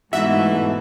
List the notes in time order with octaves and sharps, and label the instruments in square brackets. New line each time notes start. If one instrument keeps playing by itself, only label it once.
[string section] G#2 B2 A3 [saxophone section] E3 [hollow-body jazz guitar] D#4 F#4 [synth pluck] E5